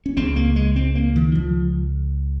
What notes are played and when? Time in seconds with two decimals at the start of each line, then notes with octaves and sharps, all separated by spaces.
0.06 C#4
0.17 C#2 C#3 C4
0.36 A#3
0.56 G#3
0.76 C4
0.95 A#3
1.16 D#3
1.35 F3